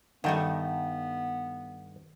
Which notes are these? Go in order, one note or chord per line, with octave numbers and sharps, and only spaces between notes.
G2 D#3 G3 A3 B3 D#4 A4 F#5